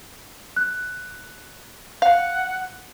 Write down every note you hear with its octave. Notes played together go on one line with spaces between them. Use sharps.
F#6
F5 F#5